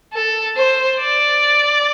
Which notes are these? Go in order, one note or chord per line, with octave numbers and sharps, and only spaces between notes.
A4
C5
D5